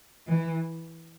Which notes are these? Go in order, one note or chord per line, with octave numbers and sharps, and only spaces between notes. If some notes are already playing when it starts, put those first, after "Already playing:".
E3